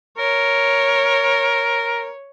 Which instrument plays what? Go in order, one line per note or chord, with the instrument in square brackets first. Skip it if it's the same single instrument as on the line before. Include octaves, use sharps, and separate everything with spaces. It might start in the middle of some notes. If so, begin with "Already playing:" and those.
[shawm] A#4 [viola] C#5